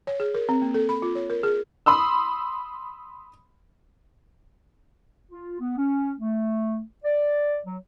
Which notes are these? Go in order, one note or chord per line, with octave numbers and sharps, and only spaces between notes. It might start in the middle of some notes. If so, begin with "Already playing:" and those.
C#5
G#4
A#4
C4
A#3
A4
B5
F4
C#5
A#4
G#4
B5 C6 D#6 E6
F4
B3
C#4
A3
D5
F#3